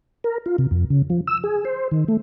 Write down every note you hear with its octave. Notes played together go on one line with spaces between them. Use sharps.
A#4
F4
C3
F2
C#3
F3
E6
G#4
C5
D#3
A3